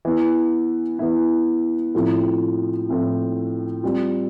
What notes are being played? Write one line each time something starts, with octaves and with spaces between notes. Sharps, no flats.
E3 B3 E4
E3 B3 E4
A2 F3 C4 E4
A2 F3 C4 E4
G3 C4 F4